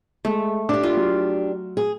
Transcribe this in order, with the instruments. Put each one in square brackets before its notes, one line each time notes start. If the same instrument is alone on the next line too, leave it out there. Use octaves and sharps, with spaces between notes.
[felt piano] G#3 [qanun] A3
[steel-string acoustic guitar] D4 G4 [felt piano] D6
[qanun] F4
[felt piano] F#3
[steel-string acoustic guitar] G#4